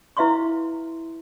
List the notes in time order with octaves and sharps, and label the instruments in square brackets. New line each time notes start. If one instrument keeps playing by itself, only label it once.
[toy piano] E4 B4 E5 F5 C6 C#6